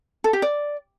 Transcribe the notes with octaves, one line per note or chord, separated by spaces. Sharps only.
A4
G4
D5